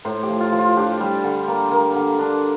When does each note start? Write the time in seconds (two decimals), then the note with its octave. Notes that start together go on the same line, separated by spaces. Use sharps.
0.05 A2 C5
0.23 G4
0.29 F3
0.40 F4
0.52 F3
0.58 F4
0.76 D4 G4
1.00 G3
1.24 D3
1.48 A#3
1.71 A#3
1.95 D3
2.19 D4